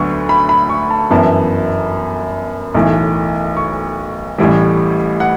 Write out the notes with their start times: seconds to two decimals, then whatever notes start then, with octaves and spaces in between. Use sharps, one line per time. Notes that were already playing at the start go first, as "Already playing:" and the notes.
Already playing: D2 D3 F#3 B3 C#6
0.29 B5
0.49 B5
0.69 C#6
0.90 A5
1.10 G1 F#2 E3 B3 E4 A5
2.74 B1 A2 E3 A3
3.57 C#6
4.38 A1 A2 E3 G3
5.20 F#5